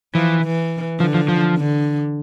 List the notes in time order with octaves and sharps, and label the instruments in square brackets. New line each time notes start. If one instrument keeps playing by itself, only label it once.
[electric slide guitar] E3 [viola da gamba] F3
[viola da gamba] E3
[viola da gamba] D3 [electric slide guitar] F3
[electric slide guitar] F3
F3
[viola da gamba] D3